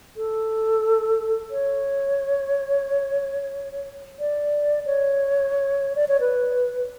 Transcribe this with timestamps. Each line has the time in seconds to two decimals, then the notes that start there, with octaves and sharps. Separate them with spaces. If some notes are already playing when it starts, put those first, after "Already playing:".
0.17 A4
1.51 C#5
4.20 D5
4.86 C#5
5.96 D5
6.08 C#5
6.20 B4